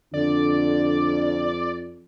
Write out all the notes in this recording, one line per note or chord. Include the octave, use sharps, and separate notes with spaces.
F2 D3 D5